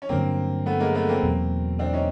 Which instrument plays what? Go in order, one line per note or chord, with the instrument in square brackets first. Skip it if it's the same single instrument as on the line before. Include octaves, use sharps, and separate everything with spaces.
[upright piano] C#4
[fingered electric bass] G2 D3 F#3 [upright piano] A#3 C4
[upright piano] A3 B3
G#3 A#3
A3 B3
A#3 C4
[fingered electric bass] E2 B2 F#3
[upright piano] C4 D4
C#4 D#4